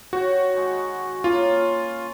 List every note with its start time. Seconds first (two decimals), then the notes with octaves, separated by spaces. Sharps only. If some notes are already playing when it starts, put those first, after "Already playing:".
0.13 F#4 C#5 G5
0.54 D#3 G#3
1.24 A#3 C#4 F4